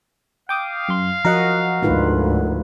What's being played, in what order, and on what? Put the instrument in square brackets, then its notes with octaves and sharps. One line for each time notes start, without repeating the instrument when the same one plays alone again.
[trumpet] F5 [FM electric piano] G5 D6 D#6
[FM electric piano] F#2 C6
[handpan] F3 F#4 D#5 [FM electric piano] A#4 F#5
[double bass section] D2 G#2 [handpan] D#4 F4 B4